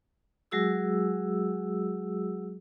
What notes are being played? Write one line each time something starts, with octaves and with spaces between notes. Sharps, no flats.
F#3 G#3 F#4 G#4 E6